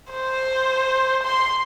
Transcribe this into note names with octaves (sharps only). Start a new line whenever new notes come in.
C5
C6